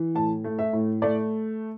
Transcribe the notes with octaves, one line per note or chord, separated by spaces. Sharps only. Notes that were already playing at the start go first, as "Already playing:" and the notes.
Already playing: E3
A2 A5
A3
E5
A2
A3 D5